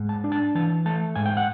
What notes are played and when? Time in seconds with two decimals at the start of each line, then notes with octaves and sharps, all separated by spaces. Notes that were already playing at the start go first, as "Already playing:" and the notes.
Already playing: G#2
0.09 A5
0.24 D4
0.32 A5
0.55 E3 A5
0.86 A3 A5
1.16 G#2 G#5
1.26 G5
1.37 F#5